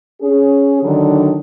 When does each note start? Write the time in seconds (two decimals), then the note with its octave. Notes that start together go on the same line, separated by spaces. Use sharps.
0.22 C#4 G#4
0.83 D3 D#3 F#3 D4